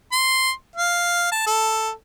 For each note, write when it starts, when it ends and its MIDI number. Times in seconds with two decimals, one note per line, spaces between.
0.12 0.51 84
0.76 1.32 77
1.32 1.42 81
1.47 1.91 69